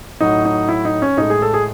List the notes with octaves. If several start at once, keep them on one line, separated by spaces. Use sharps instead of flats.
A2 F#3 D#4
D#4
E4
D#4
C#4
A2 G#3 D#4
G#4
A4
G#4